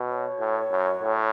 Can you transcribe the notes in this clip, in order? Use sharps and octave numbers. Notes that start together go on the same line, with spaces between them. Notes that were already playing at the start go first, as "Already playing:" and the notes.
Already playing: B2
C#5
A2
F#2
A2